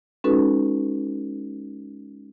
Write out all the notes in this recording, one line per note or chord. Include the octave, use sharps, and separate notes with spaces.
G#3 C#4 D#4 F#4 A4 B4